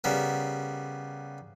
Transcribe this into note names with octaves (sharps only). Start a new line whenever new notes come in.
C#3 G3 B3 A#4